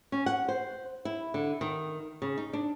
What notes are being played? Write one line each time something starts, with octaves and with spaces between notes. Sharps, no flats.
C#4
F#5
C5
E4
D3
D#3
C#3
D#4
D4